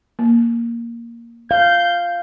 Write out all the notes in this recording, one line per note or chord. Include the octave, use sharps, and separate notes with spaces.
A#3
F5 G6